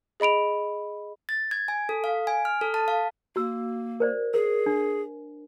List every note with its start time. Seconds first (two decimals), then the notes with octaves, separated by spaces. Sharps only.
0.20 G#4 D#5 B5 D7 F7
1.29 A6
1.51 G#6
1.68 G#5
1.89 A4
2.04 F5
2.27 G#5
2.45 F6
2.61 A4
2.74 A5
2.88 F5
3.36 A#3 F#4 E6
4.00 A#4 C5 D5
4.34 G#4 A#4
4.66 D4